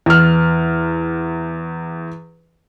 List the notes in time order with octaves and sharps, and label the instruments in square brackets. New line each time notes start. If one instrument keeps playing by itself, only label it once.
[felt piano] E2 F6